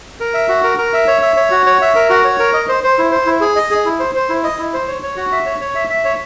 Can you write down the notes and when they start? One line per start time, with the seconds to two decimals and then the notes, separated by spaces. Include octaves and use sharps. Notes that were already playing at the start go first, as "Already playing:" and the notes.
0.20 A#4
0.34 E5
0.49 F#4
0.63 A#4
0.78 A#4
0.94 E5
1.08 C#5
1.22 E5
1.36 C#5
1.51 F#4
1.66 C#5
1.81 E5
1.95 A#4
2.10 F#4
2.24 C#5
2.39 A#4
2.53 D#5
2.68 C5
2.84 C5
2.98 E4
3.12 C5
3.27 E4
3.41 G#4
3.56 D#5
3.71 G#4
3.85 E4
3.99 C5
4.15 C5
4.29 E4
4.44 D#5
4.59 E4
4.73 C5
4.88 C#5
5.03 C#5
5.16 F#4
5.32 E5
5.46 C#5
5.61 C#5
5.75 E5
5.90 E5
6.05 C#5